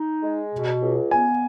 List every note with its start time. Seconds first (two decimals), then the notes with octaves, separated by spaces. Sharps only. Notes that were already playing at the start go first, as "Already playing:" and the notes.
Already playing: D#4
0.22 G#3
0.53 B2
0.81 C#2
1.11 B3 G#5